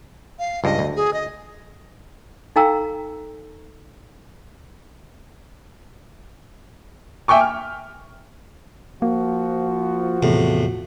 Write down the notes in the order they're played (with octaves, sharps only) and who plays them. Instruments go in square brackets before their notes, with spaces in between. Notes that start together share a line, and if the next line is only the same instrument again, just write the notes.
[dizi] F5
[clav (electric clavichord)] C#2 G2 [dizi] D#5
[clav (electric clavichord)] D2
[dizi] G#4
D#5
[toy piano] D#4 A4 F5 G5 A#5 E6
[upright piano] E5 G5 G#5 C#6 D6
F6
[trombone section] F3 F#4 [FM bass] A#3
[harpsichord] E2 A2 [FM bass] C3